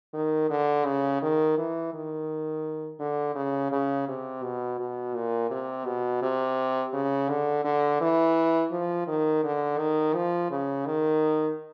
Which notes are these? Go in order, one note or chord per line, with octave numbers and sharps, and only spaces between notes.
D#3
D3
C#3
D#3
E3
D#3
D3
C#3
C#3
C3
B2
B2
A#2
C3
B2
C3
C#3
D3
D3
E3
F3
D#3
D3
D#3
F3
C#3
D#3